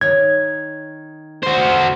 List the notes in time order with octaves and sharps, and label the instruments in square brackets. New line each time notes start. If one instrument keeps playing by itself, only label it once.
[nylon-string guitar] D#3 C#5 [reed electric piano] G#6
[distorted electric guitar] F#4 C5